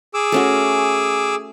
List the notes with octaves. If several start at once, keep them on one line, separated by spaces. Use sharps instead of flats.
G#4 D6 E6
A3 C#4 F#4